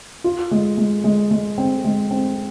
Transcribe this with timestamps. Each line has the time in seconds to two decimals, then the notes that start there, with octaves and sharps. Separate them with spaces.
0.24 F4
0.51 G#3
0.78 G#3
1.04 G#3
1.31 G#3
1.58 C4
1.84 G#3
2.11 C4